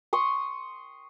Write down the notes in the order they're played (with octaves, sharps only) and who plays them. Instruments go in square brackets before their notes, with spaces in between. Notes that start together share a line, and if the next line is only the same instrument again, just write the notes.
[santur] C6 C#6 D#6